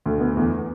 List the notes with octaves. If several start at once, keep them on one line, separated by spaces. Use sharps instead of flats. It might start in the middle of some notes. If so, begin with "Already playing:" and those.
D2
B3
E2